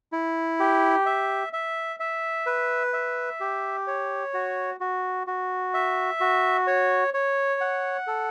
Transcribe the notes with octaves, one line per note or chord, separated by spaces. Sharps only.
E4
G4
E5
E5
E5
B4
E5
G4
C#5
F#4
F#4
F#4
E5
F#4
C#5
C#5
F#5
A4